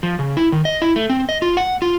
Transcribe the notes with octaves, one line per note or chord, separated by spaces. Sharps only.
F3
C#3
E4
D#3
D#5
E4
A3
C4
D#5
F4
F#5
F4